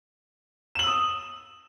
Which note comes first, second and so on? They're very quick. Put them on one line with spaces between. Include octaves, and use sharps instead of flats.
E7 F#7 E6 D#6